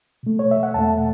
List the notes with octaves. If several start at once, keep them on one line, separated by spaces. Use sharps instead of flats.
B2 A3
C#5
E5
F#5
E2 B2 A3 A5